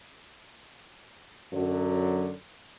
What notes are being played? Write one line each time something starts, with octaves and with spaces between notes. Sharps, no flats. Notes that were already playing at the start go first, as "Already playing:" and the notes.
F#2 D3 F#3